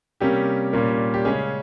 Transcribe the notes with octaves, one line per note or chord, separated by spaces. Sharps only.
C3 G3 A#3 C#4 G4
A#2 G3 A#3 C#4
G4
C#3 G#3 C#4 G#4